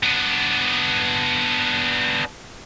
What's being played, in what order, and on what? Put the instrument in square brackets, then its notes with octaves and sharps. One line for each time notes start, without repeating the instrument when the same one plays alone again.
[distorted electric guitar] B3 D4